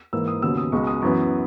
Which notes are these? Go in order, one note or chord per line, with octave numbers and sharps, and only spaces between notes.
G#2 E3 A#3 E6
D#6
D#2 C#3 F#3 B3 E6
D#6
C#2 B2 G#3 C#6
D#6
F#2 E3 B3 C#6